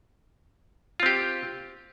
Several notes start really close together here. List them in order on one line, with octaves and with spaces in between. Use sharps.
F4 C4 G4